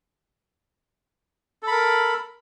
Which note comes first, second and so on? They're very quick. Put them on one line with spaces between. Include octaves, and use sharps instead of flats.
A4 B5 A#4